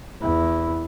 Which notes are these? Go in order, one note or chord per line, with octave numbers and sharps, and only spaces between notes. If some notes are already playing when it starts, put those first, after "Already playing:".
E2 E4